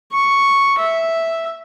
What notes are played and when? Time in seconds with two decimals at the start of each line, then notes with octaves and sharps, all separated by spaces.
0.12 C#6
0.79 E5